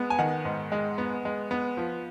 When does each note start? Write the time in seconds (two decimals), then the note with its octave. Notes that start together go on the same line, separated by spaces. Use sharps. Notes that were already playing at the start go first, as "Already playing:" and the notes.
Already playing: G#3 B3
0.10 G#5
0.19 D#3 F#5
0.45 G#2
0.72 G#3
0.98 B3
1.25 G#3
1.51 B3
1.77 F3